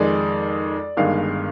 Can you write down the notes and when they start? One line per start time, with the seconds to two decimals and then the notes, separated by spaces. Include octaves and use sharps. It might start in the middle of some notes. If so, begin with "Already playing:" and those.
Already playing: F2 D#3 G#3 D5
0.97 G1 G2 D#3 G#3 F5